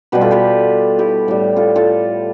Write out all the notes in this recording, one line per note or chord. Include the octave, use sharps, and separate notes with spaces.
B2 G3 G4 B4
F4 A4
G4 B4
E4 G4
A2 G3
F4 A4
F4 A4